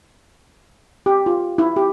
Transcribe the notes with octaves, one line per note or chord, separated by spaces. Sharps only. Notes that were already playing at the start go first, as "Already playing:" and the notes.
G4
F4
E4
G4